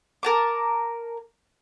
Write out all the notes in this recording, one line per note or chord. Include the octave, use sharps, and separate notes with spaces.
A#4 A5 D6